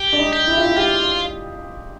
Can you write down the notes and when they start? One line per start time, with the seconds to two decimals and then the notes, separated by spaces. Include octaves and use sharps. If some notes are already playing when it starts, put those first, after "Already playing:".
Already playing: G4
0.13 D4
0.19 D#4
0.33 G4
0.47 E4
0.57 F4
0.66 E4
0.76 F4 G4